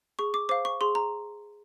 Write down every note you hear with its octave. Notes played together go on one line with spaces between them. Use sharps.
G#4 C#6
D6
C5 F5 D6
C#6
G#4 C6
A#5